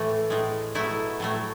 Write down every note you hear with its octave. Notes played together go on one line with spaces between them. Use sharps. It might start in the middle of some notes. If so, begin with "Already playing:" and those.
Already playing: A2 E3 A3
A2 G#3
B2 F#3 A3 E4
A2 F#3 A3